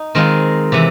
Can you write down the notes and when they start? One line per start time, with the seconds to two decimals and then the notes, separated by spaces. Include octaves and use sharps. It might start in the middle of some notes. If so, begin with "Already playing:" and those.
Already playing: D#4
0.15 D#3 G#3 C4 F4 A#4
0.72 C3 E3